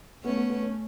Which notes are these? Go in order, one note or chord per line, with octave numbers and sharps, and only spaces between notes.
A3 B3 C#4
B3
B3
C#4